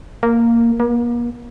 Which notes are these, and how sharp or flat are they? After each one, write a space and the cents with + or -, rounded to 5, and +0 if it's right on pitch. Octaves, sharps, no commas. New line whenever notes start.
A#3 -5
A#3 +40